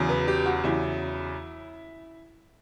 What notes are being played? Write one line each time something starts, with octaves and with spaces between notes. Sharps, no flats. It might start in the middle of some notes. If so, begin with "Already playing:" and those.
Already playing: E2 C#3 F#3
B4
G4
F#4
E2 C#3 F#3 E4